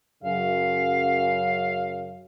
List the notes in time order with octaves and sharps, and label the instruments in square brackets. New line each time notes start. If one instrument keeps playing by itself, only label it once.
[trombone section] F#2 C#3 [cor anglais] F5